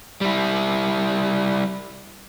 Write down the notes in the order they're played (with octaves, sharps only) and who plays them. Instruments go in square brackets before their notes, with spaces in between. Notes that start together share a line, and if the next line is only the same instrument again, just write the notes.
[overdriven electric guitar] G3 E4